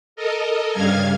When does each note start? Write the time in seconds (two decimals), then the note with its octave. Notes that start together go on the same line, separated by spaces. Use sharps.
0.16 A4 A#4 D#5
0.72 G2 C#3 G3 F5 F6 G#6